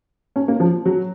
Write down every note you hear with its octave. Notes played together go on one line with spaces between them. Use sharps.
C#4
A#3
F3
F#3